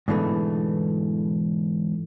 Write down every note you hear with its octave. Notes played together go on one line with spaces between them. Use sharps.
G#2 B2 D3 E3 G3 A3